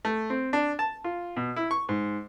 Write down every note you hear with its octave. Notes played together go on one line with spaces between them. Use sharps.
A3
C4
D4
A5
F4
B2
E4
C#6
G#2